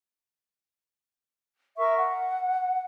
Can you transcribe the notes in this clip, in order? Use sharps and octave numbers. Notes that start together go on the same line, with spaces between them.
A#4 E5 C#6
F#5